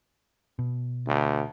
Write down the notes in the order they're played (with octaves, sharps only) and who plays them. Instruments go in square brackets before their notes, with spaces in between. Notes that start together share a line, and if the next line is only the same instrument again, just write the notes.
[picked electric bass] B2
[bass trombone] D2